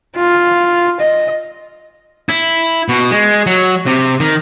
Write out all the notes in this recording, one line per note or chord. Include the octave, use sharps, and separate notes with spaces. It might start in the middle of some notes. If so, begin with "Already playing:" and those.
F4
D#5
E4
B2
G#3
F#3
C3
D#3